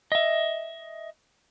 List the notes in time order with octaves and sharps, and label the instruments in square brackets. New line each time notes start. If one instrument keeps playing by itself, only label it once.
[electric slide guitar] D#5 E5